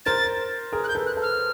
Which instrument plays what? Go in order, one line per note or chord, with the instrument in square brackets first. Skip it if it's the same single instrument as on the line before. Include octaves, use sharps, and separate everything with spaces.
[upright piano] A#4 C5 [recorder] A6
[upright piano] G#4 A#4
[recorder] F#6
G6
[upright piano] A4 B4
[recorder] F#6
[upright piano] A4 B4
[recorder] F6